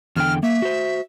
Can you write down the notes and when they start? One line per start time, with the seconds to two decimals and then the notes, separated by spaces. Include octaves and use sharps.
0.16 E2 D3 G5 F6
0.43 A#3 E5
0.62 F#4 C5